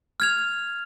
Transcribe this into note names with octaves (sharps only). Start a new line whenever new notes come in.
F6 G#6 F7